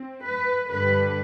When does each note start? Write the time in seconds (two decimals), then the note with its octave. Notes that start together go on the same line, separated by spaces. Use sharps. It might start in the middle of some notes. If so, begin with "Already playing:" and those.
Already playing: C4
0.25 B4
0.69 G2 D3 G3 B4